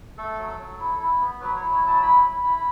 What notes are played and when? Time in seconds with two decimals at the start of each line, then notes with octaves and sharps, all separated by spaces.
0.18 A3 A4
0.38 F#3
0.59 F#3
0.80 E4
1.00 E4
1.21 B3
1.40 F#3 B4
1.56 C#5
1.61 E4
1.72 C#5
1.82 F#3
1.87 A5
2.02 E4 B5
2.23 E4
2.43 E4